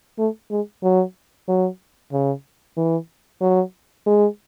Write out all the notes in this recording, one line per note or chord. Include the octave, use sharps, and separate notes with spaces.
A3
G#3
F#3
F#3
C#3
E3
F#3
G#3